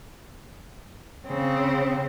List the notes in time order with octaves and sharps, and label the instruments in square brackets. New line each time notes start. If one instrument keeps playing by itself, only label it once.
[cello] C#3 C4